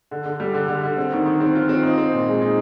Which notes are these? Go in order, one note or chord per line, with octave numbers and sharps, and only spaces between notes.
D3
D3
G3
D3
D3
D3
C4
D#3
D#3
C4
F4
C4
D#4
C4
A#2
G#3
D#4